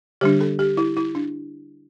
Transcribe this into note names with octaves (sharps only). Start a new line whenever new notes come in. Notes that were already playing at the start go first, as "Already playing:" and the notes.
D3 G3 D4 G4
A4
G4
E4
E4
D4